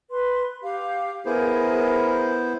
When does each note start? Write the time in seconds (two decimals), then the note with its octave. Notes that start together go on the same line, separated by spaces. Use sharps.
0.10 B4 C6
0.63 G4 F5
1.26 B3 E4 G#4 A#4 C5 G#5